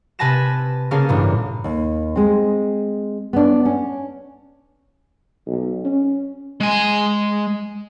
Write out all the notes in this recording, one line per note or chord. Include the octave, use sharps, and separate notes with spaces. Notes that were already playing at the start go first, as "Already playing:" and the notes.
C3 B4 G#5 A5 A#6 E7
C#3 A#3 C#4 G#4 A5
A1 G2 A#2
D#2
G#3 C4
B3 D4
C#4
B1
C#4
G#3 G#5